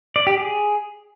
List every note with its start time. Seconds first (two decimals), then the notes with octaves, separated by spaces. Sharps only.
0.16 D5
0.27 G4
0.38 G#4